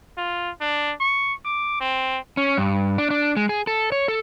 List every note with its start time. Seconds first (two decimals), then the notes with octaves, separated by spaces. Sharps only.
0.17 F4
0.61 D4
1.00 C#6
1.45 D6
1.80 C4
2.37 C#4
2.58 G2
2.98 D4
3.10 D4
3.37 G#3
3.49 G#4
3.67 A4
3.92 C#5
4.08 A4